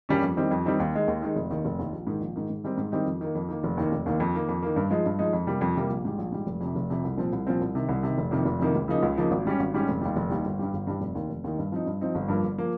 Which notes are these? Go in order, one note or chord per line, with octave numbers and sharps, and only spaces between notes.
G2 G3 A#3 C#4
F2
D#3 G3 C4 D#4
F2
D#3 G3 C4 D#4
D#2
D#3 G#3 D#4
D#2
D#3 G#3 D#4
F1
D#2 D#3
F1
D#2 D#3
A#1
G#2 D#3
A#1
G#2 D#3
G#2
D#3 G3 C4 D#4
G#2
D#3 G3 C4 D#4
F2
D#3 A#3
F2
D#3 A#3
F1
D#2 D#3 A#3
F1
D#2 D#3 A#3
F2
D#3 A#3
F2
D#3 A#3
G2
F3 G#3 D#4
G2
F3 G#3 D#4
F2
C3 G3 A#3
F2
C3 G3 A#3
A#1
G#2 G3
A#1
G#2 G3
F1
F2 C3
F1
F2 C3
C2
A#2 F3 C4
C2
A#2 F3 C4
C2
C3 D#3
C2
C3 D#3
F1
F2 C3 D#3 A#3
F1
F2 C3 D#3 A#3
C#2
C#3 F3 A#3 D#4
C#2
C#3 F3 A#3 D#4
G#1
G#2 G3 C#4
G#1
G#2 G3 C#4
F1
D#2 D#3 G3
F1
D#2 D#3 G3
G1
G2 G3
G1
G2 G3
F1
D#2 D#3
F1
D#2 D#3
G2
F3 C4 D#4
G2
F3 C4 D#4
G1
G2 F3 A#3
G1
F3 A#3